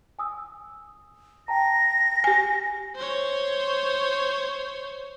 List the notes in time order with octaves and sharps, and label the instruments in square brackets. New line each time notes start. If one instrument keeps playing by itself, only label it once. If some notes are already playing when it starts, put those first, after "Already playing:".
[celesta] G#5 D#6 E6
[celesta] G5 A5 A#5 [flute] A#6
[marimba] G4 G#5
[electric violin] C5 C#5